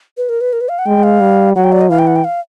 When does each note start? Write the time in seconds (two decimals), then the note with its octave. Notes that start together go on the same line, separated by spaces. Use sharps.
0.17 B4
0.29 A#4
0.41 B4
0.53 A#4
0.61 B4
0.69 F5
0.79 F#5
0.86 G#3 G5
1.03 F5
1.20 G3
1.56 F#3 F#5
1.64 G5
1.72 D5
1.81 D#5
1.90 E3 F5
1.99 G5
2.07 F#5
2.16 G5
2.24 F5